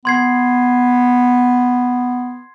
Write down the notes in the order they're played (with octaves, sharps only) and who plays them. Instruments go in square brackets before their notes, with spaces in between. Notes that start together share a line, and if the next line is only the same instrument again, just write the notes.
[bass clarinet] B3 [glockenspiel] C6 G#6 C7